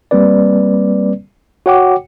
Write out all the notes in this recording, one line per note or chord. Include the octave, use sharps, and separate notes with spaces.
G3 A#3 C4 B4 D5
F#4 C#5 F#5 G5 D6